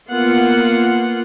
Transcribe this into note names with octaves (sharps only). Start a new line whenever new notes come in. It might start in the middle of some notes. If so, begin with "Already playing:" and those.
A#3 B3 F4 F#5